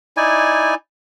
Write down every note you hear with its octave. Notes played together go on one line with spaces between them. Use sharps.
D#4 E4 D5 G#5